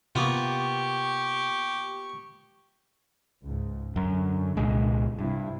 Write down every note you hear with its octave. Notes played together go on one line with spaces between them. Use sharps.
C3 A#3 B3 F4 G4 C#6
C#2 G#2
F#2 D3
C2 A#2 G#3
G2 C3 E4